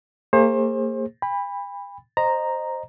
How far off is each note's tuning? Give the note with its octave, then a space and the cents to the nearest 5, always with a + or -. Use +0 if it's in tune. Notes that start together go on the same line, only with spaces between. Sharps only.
A#3 -35 G#4 -25 C5 +30
G5 +45 B5 +0
C5 +0 D#5 -20 A#5 +0